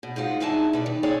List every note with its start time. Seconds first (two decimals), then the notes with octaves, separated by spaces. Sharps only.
0.03 B2
0.16 G#2 G#3 F4 F#4
0.40 G2 G#3 D#4 E4 D5 A5
0.73 B2 B4 D5
0.86 D#3
1.03 G#4 A4 C#5 D5 G5